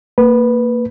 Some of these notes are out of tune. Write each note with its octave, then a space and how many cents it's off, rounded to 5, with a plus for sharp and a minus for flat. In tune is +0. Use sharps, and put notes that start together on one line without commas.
A#3 -25 B4 -5